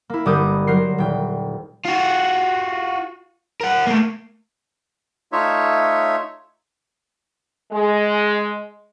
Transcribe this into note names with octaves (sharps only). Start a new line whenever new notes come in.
A#3 E4
G1 G3 A#4 D6 D#6 G6
F#3 A#4 C5 C7
D#1 G5
F4 F#4
A#4 F#5
A3 A#3
A3 D#4 F4 C#5 E5
G#3